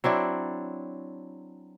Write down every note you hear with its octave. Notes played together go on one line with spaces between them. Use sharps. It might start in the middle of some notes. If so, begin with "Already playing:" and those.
F#3 C4 D4 E4